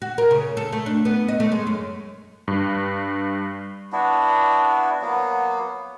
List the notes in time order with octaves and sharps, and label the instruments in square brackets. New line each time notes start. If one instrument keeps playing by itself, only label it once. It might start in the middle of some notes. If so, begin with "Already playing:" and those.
[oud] F#4
A#4
C#3
A4
A3
D4
B3
D#5
A3
G#3
F#2
[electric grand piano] G2
[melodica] B3 D4 E4 F#4
F#3 A#3 B3